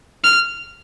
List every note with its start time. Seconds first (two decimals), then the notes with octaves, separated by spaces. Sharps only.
0.24 F6